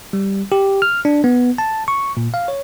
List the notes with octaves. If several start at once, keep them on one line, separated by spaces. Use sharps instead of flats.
G3
G4
F6
D4
B3
A5
C#6
A#2
F5
C#5